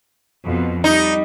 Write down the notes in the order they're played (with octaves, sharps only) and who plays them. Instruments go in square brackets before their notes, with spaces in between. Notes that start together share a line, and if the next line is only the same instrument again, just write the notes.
[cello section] F2 B2
[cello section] G3 [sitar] D#4